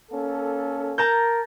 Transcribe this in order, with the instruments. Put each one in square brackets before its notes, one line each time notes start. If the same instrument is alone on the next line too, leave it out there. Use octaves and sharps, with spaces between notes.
[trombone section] A#3 C#4 A4
[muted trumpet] A#4 [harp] A5 A#5 G6